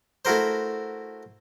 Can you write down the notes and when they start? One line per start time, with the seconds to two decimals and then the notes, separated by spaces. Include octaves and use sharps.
0.25 A3 E4 F#4 A#4 C5